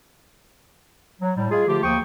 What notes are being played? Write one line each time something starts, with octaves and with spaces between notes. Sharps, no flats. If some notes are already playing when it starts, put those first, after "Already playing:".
F#3
A2 G3
G#3 F4 G#4
D3 F3 A3 F4 G4
D#2 F3 A#3 G5 C#6 D#6